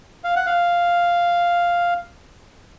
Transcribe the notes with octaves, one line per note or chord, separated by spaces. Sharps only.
F5
F#5
F5